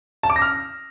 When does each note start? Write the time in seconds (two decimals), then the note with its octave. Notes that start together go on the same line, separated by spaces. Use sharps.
0.23 A5
0.30 D6
0.36 A#6
0.42 F6